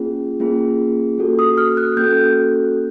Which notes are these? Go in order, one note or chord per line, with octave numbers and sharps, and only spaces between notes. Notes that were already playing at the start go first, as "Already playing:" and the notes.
Already playing: A#3 C#4 F4 G#4
A#3 C#4 F4 G#4
A#3 C#4 F#4 A4
D#6
F6
F#6
A#3 C#4 F#4 A4 G6